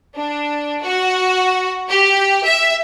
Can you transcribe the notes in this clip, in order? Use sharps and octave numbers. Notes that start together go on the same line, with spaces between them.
D4
F#4
G4
E5